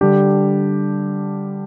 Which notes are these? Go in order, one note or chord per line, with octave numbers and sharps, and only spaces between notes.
D3 G3 D4 G4